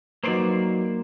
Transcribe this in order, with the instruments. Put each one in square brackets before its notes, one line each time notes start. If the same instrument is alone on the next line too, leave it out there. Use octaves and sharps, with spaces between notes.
[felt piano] F#3 D#4 B4 [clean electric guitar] A#3 C5 D5